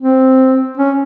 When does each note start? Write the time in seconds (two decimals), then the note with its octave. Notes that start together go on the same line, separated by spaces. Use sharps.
0.01 C4
0.78 C#4